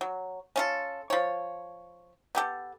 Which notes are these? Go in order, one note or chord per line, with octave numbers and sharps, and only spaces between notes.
F#3
C#4 F4 A4
F3 C#5
B3 G4 A4